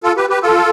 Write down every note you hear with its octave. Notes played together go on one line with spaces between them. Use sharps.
F4 A4
G4 B4
G4 B4
F4 A4